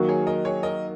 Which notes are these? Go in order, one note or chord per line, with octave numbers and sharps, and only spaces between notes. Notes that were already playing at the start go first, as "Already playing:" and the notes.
Already playing: D#3 F#3 A#3 F#4
G#4 C#5
A#4 D#5
G#4 C#5
A#4 D#5